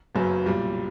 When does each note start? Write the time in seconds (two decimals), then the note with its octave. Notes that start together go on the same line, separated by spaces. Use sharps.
0.15 F#1 F#2 C#3 F#3 B3
0.46 B1 A#2 G3